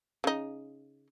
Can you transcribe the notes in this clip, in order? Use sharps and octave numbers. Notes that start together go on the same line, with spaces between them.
C#3 D#4